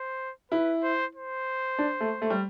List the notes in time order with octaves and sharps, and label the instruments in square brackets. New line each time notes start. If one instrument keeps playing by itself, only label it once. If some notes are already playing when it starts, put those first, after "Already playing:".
Already playing: [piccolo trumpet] C5
[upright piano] E4 [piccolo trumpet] B4
[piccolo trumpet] C5
C5
[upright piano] D4
A3
A3
G3